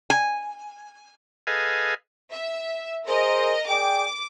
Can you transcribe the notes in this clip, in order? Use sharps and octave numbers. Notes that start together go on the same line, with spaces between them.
G#5
G#4 A4 B4 D#5 F5 G#5
E5
G#4 A#4 C5 D#5
G#4 D5 G5 D6